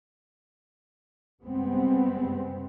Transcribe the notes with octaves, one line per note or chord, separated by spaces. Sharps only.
F#1 C3 G3 G#3 B3 C4